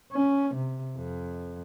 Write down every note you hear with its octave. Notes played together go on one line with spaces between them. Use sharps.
C#4
C3
F2